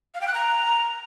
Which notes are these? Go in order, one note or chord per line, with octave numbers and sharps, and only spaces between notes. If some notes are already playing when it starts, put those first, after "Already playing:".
F5
G5
F#6
A#5